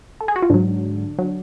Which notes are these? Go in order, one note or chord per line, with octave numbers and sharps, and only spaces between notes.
A4
G#4
F#4
F4
G#2 D3 F#3 D4
F#3